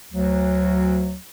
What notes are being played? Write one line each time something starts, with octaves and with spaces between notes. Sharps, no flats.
D2 F#3